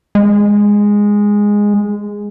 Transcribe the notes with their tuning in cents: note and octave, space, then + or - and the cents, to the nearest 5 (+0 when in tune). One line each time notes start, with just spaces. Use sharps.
G#3 -10